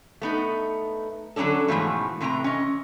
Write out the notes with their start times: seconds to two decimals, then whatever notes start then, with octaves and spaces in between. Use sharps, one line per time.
0.22 A3 B3 D#4
1.36 D3 F#3 B3 C#4 D4 A4
1.68 G#2 B2 E3 F3 A3
2.21 A2 C3 E3 A5 A#5
2.44 C#4 D#5